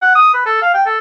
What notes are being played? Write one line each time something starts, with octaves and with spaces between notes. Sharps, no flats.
F#5
D#6
B4
A4
F5
G5
A4